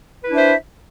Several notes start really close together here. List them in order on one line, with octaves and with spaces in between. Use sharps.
B4 E4 D4 E5 C5